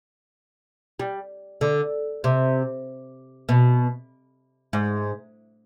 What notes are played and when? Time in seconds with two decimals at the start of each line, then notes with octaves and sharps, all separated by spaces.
0.99 G3
1.61 D3
2.24 C3
3.49 B2
4.73 G#2